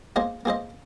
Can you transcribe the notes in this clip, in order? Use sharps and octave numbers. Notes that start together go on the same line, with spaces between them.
A#3 G#4 C5 D#5
A#3 G#4 C5 D#5